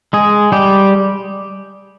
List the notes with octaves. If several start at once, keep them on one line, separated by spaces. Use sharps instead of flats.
G#3 G#4
G3 G4